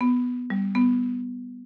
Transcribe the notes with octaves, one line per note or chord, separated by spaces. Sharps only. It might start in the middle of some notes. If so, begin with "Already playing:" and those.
B3
G3
B3